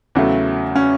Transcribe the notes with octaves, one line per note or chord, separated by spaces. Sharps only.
E2 C#3 F#3 A3
C#4